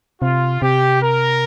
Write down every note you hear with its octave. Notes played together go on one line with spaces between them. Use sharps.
C3 F4
C3 G4
A#4